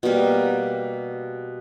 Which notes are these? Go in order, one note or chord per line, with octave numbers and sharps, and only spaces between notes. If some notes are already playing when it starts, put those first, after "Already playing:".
B2 G3 A#3